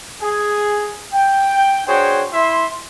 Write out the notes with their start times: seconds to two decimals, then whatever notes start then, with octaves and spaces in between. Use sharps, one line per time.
0.21 G#4
1.13 G5
1.87 D4 F#4 G#4 C5 C#5 G5
2.33 E4 E5 C6